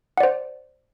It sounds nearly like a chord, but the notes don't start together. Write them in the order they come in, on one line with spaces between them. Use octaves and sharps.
F#5 D5 C5